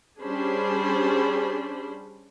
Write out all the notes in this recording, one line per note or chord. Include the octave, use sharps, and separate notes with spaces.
G3 C#4 D4 G#4 C5 B5